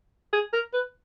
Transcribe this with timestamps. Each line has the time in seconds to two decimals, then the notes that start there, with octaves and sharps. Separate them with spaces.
0.33 G#4
0.53 A#4
0.73 B4